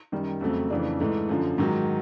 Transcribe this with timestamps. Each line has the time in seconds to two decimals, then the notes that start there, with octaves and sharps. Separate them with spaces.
0.12 F#2 D#3 G3
0.41 F2 C#3 F#3 A3 C4
0.70 F2 C#3 E3 A3 D4
1.00 G#2 E3 A3
1.29 F#2 D3 F3
1.58 G#2 D#3 F#3